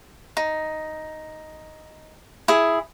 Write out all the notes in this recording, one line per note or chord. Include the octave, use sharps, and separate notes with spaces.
D#4
E4 G#4